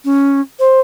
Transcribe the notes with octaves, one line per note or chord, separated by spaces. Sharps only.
C#4
C5